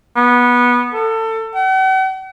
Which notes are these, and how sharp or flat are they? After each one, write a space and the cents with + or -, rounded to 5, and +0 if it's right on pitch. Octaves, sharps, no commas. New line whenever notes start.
B3 -15
A4 +25
F#5 +45